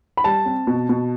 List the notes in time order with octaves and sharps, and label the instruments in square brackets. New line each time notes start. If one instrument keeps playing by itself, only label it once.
[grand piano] B5
[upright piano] G3 [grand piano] A5
[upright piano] C4
B2
B2